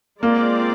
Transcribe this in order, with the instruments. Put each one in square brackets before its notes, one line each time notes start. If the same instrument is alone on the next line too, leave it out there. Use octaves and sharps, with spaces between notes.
[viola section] G#3 C4 F4 A#4 D5 [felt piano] A#3